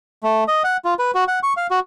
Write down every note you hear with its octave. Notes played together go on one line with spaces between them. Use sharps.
A3
D#5
F#5
F4
B4
F#4
F#5
C#6
F5
F#4